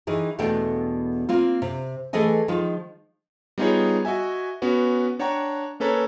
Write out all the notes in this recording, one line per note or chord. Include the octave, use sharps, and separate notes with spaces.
D#3 E3 G#4
E2 B2 A3 B3 D4 G5
A#3 C4 F4
C3
E3 A3 G#4 A4 D#5 G#5
D#3 F3 G#3 F4
G3 B3 D#4 F4 G#4 C#5
F#4 D#5 E5 G#5
B3 C#4 F#4 B4
D4 C#5 F#5 G5 A#5 C#6
A#3 C#4 A4 B4 C#5 A#5